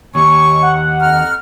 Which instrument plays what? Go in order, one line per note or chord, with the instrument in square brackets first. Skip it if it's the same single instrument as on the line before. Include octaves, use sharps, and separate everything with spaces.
[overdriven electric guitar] D#2 [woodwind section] C#5 G#5 C#6
[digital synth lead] F#5
[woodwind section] F2 A#5 F6